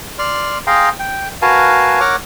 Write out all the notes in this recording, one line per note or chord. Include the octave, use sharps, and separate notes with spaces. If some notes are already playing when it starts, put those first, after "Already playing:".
D5 C6 F6
G#4 F5 G5 A#5 C6
G5
F#4 A#4 B4 F5 G#5 A5
A#4 C#5 F#5 D6 F6